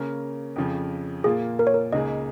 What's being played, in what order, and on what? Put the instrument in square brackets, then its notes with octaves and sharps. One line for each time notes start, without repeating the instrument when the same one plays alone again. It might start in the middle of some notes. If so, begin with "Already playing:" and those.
Already playing: [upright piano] C#3 A#3 C#4 A#4
F2 C#3 F3
[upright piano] A#2 A#3 F4 [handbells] G#4
[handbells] A#4
C#5
A#4
[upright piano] C#2 C#3 A#3 D#4 G#4 [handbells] D#5